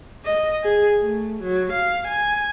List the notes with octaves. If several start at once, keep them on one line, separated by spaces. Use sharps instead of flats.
D#5
G#4
A3
F#3
F5
G#5